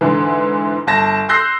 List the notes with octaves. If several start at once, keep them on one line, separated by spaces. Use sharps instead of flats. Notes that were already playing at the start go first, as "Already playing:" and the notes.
G#2 D3 E3
G1 A5 A#6
C6 E6 F#6 G6 A#6 C7